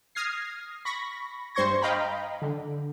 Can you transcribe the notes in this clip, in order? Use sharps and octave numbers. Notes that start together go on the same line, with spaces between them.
D#6 F6 G#6 A#6 C7
B5 C#6 A#6
G2 C5 C6 C#6 G#6 A#6
D#5 F5 G5 A#5 B5
D3